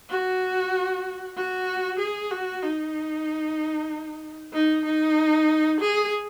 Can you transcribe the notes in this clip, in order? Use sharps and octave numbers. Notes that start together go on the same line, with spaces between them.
F#4
F#4
G#4
F#4
D#4
D#4
D#4
G#4